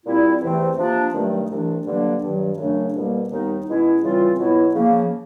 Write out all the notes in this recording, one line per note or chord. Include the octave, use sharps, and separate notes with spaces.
A#2 G3 C4 E4
E2 C3 E3 A3 C4
C3 F3 A#3 D4
G2 D#3 F#3 A3
C2 C3 E3 A3 D4
G2 D3 F#3 A#3 D4
G2 D#3 F#3
F#2 C#3 F#3 A3 D4
C2 B2 G3 A#3
D#2 D#3 G3 B3 D#4
B2 G#3 C#4 E4
C#3 E3 G3 C4 F4
B2 F#3 B3 E4
C#3 F3 A#3